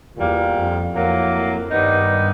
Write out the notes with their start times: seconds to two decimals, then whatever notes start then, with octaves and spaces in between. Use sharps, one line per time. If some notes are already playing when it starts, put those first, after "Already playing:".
0.16 E2 A#2 G3 A#3
0.55 F2
0.93 F2 A2 F#3 A#3
1.70 G2 D#3 G3 B3 D#4